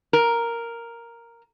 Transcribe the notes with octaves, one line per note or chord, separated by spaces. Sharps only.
A#4